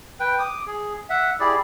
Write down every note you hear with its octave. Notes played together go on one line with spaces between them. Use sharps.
B4 G5
D6 D#6
G#4
E5 F#5
E4 G4 G#4 D5